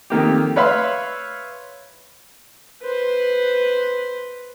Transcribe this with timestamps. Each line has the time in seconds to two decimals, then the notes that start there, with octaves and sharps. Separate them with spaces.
0.10 F2 D#3 A#3 G4
0.56 B4 C#5 E5 F5 B5 C6
2.82 B4 C5